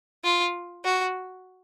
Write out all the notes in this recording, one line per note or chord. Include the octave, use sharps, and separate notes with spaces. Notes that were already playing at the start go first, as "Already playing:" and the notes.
F4
F#4